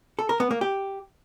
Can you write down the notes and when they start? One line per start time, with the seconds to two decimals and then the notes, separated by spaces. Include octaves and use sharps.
0.19 A4
0.29 A#4
0.40 B3
0.51 A#3
0.61 G4